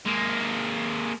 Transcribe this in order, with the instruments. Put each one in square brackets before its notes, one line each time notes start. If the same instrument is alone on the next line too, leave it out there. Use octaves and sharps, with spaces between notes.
[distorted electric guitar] G#3 A#3